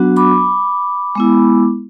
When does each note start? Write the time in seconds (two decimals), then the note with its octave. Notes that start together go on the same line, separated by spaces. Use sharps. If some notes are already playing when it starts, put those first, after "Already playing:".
Already playing: F#3 B3 D4 F#4
0.16 B5 D6
1.15 G#3 B3 E4